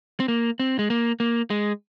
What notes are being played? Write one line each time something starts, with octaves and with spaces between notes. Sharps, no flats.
C4
A#3
C4
G#3
A#3
A#3
G#3